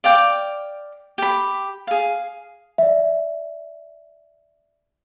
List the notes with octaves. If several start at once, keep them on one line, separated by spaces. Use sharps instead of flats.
D5 F5 G5 D6
G4 B5
G#4 F5
D5 E5